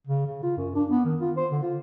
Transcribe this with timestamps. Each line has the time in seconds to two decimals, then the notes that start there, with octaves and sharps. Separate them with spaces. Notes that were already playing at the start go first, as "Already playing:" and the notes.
0.07 C#3
0.26 C#3
0.43 F4
0.57 F#2
0.75 D4
0.90 B3
1.05 D#3
1.21 F4
1.37 C5
1.51 D3
1.62 F4